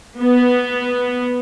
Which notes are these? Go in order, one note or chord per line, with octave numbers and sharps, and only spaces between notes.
B3